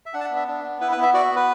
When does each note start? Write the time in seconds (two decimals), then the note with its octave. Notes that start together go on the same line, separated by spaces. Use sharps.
0.06 E5
0.14 D4 F#5
0.21 A5
0.24 F#5
0.30 B3
0.36 E5
0.48 D4
0.64 B3
0.81 E4 B4
0.92 B4
0.98 B3
1.03 E5
1.14 F#4 D5
1.30 B3
1.36 B4